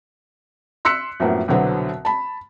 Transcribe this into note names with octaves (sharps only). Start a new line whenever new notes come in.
C6 E6 F#6 B6 C#7
F#2 A2 F3 A#3 B3
C2 B2 D3 F#3 B3 C4
A5 B5